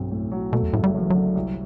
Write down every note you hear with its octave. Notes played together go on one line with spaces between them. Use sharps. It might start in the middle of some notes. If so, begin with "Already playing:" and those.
Already playing: B1 G2 C4
A2
F#3
B2 A3
E2
F#1 A2
G3
F#2 F#3
E3
D3 F#3
C2